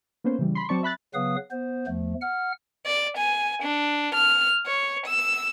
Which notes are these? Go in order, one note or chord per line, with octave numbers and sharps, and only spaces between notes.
A#3 B3 C#4 C5
C#3 E3 G3
B5 C6
F#3 C4 D5 A5 C#6
E5 B5 F#6 A6
C#3 F#3 B3 B4 F5 D#6
B3 C5
E2 F3 A3
F#5 F6
D5
G#5
D4
F6
C#5
E6